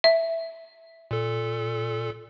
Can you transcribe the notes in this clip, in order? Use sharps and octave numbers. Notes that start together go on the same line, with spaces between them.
E5
A#2 A4